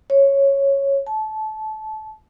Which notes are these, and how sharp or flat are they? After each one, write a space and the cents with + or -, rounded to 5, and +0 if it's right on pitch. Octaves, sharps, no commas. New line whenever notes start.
C#5 -5
A5 -20